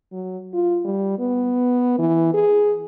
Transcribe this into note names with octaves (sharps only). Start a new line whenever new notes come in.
F#3
F4
G3
B3
E3
G#4